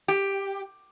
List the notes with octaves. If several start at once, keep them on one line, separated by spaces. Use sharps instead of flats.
G4